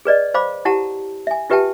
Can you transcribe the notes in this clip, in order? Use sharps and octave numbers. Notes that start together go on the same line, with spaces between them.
G#4 B4 D5 D#5
C5 F5 B5 D6
E4 G4 F#5 A5 A#5
E5 G#5
F4 G4 B4 E5 G5 A5